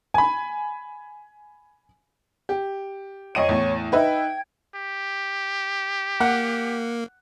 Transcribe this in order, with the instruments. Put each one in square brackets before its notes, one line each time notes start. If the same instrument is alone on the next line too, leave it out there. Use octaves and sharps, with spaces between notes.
[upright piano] G#5 B5
[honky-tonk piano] G4
[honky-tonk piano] F2 D#5 D#7 [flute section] C#5 C#6
[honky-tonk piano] E2 A2
[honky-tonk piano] D#4 B4 E5 [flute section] G5 G#6
[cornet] G4
[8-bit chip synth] A#3 [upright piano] F#5